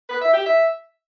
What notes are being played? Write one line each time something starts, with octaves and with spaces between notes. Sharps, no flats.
B4
E5
G4
E5